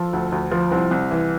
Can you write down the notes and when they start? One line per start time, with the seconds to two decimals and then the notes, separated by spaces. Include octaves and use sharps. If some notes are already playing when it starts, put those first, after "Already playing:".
Already playing: F3 A4
0.13 D2
0.32 D2
0.51 F3
0.71 C2 C4
0.91 C2
1.11 E3